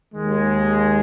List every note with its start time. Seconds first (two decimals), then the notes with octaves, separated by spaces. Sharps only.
0.13 D#2 D#3 G#3